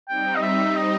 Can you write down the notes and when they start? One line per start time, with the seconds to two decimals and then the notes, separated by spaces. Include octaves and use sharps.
0.09 G3 C4 D#4 G5
0.36 D#5
0.42 E5
0.76 D#5